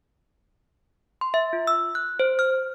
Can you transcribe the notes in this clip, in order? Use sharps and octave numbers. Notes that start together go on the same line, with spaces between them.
C6
E5
F4
E6
F#6
C5
F6